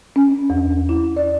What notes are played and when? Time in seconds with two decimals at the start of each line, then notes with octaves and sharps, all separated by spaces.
0.16 C#4
0.50 E2
0.89 E4
1.16 D5